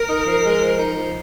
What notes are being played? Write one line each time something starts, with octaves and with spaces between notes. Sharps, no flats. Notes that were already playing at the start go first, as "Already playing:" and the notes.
Already playing: A#4
D#4
F3
G#3
F3
D#4
F3